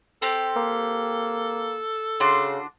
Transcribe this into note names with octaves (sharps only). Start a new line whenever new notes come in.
C4 G4 A4
A#3
C#3 D4 F#4 C6